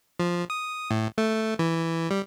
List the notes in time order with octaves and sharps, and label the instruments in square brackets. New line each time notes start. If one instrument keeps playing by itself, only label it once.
[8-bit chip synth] F3
D#6
A2
A3
E3
G3